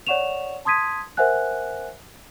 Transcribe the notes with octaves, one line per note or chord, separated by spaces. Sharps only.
C#5 D5 F#5 C#6 E7 F7
A5 C6 D#6 G#6 B6 D#7
A#4 C5 E5 F#5 G#5 F#6